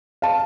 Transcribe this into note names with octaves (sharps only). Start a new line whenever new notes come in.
F5 A5